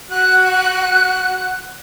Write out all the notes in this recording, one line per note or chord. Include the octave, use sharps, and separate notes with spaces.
F#4 F#6